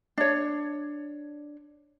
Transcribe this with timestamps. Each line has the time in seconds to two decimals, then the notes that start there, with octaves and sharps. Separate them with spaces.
0.18 D4 C#5